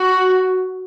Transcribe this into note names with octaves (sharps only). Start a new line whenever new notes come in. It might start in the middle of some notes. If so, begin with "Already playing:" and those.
Already playing: F#4